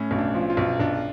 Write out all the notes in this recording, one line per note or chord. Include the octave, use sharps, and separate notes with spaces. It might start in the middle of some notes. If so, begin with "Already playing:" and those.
Already playing: A2 C#4
B1
D4
F3
F4
B1
B1 D4